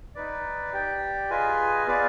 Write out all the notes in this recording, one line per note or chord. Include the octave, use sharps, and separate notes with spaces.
D#4 B4 D5
G4 D5 G5
F4 G#4 B4 D#5 G#5
B3 F4 G#4 B4 D5